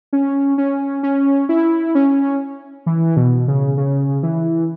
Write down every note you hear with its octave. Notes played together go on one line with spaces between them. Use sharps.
C#4
C#4
C#4
E4
C#4
E3
B2
C#3
C#3
E3